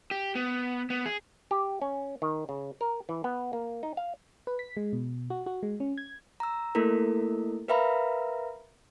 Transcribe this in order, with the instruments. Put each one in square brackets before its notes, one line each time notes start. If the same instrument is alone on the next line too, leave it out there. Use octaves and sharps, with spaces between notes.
[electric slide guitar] G4
B3
B3
G#4
[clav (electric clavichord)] G4
C#4
D#3
C#3
A#4
E3
B3
A#3
D#4
F5
[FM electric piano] B4
B6
G#3
B2
F#4
F#4
G#3
C#4
G#6
[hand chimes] A#5 E6
A3 A#3 E4 A4 A#4
A#4 B4 E5 F5 A#5 B5